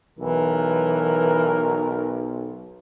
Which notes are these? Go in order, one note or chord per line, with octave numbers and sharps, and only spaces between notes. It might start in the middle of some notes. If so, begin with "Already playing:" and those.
B1 E3 A#4